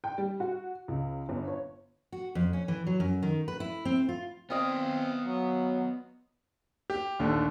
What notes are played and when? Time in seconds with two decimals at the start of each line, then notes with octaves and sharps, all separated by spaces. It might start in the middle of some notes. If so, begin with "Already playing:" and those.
0.04 G5
0.18 G3
0.40 F#4
0.88 C#2
1.29 G1
1.48 C#5
2.12 F#4
2.35 F2
2.53 C#4
2.68 E3
2.86 F#3
3.00 F#2
3.23 D#3
3.48 B4
3.60 E4
3.85 C4
4.09 F4
4.50 B3 C4 F4 D5 D#5 F5
5.26 F#3
6.90 G4
7.19 A#1 D#2 D3 A3